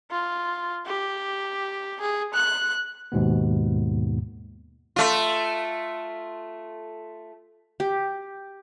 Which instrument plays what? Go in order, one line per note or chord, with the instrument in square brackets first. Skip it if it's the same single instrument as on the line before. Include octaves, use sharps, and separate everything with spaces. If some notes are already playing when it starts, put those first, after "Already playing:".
[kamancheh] F4
G4
G#4
F#6
[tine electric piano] D#2 G#2 B2 B3
[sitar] A3 F4
[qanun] G4